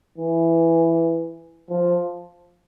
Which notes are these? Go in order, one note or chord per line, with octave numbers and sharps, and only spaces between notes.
E3
F3